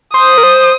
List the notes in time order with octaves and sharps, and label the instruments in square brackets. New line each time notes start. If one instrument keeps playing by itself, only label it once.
[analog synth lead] C5 [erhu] D#6
[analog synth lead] A#4
C5